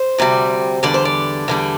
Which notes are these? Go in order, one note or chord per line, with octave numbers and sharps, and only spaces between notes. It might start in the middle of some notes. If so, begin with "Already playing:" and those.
Already playing: C5
D2 C3 G3
E2 D3 G3 D5
C5
D5
E2 D3 G3